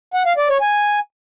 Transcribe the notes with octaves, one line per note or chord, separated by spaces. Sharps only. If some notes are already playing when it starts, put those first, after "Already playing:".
F#5
F5
D5
C#5
G#5